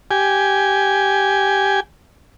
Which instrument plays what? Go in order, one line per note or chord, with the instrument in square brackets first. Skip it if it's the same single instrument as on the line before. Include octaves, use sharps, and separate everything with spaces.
[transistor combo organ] G4 G#5